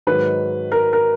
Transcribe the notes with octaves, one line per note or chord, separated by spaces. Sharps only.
G#2 D#3 F#3 B4
A#4
A#4